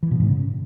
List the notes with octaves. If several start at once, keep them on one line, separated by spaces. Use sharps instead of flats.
E3
B2
G#2
C#3